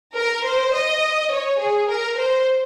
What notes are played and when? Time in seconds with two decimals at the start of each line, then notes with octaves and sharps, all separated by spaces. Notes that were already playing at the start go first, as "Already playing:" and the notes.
0.16 A#4
0.44 C5
0.74 D#5
1.31 C#5
1.60 G#4
1.88 A#4
2.17 C5